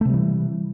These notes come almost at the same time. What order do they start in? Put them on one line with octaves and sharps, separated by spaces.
A3 C3 G3 E3